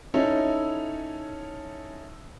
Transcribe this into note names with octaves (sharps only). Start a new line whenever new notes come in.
C#4 D#4 E4 A4